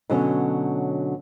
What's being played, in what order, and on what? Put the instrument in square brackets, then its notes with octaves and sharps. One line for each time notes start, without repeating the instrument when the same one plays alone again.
[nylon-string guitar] B2 D3 F#3 C#4